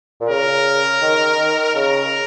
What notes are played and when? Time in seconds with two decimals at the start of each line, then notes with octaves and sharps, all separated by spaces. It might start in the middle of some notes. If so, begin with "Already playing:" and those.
0.21 A#2
0.29 C#3 A#4
1.01 D#3
1.20 D#3
1.39 D#3
1.57 D#3
1.75 C#3 A#4